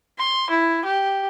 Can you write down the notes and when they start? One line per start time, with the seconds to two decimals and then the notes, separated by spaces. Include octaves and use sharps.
0.19 C6
0.50 E4
0.85 G4